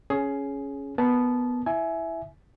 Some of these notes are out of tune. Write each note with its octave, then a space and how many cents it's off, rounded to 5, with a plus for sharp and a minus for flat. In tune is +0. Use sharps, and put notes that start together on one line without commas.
C#4 +0 G#4 +15
B3 +0 A#4 +0 A5 -20
E4 +0 E5 +0 G#5 +20